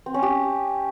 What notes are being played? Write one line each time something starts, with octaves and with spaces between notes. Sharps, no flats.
C4
C#4
G4